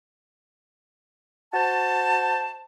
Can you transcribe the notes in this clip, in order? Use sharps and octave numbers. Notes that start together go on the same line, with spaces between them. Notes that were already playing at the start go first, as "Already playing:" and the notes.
F#4 C5 A5